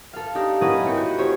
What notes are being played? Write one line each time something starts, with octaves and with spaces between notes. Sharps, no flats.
A4 F5
D4 D#4 G4
A#3 C#4 E4 B4 D#5 F#5
A#3 C4 G5 C#7
E4 F#4 G6
C#4 E4 G4 C5 C#5